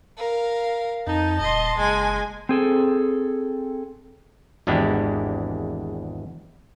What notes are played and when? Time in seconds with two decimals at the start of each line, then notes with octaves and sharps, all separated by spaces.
0.17 A#4 F5
1.07 F2 D#4 A5
1.40 D#1 D#5 C6
1.78 F#1 G#3 G#5
2.49 C4 G#4 A4
4.67 G#1 E2 G#3 D4 E4 G4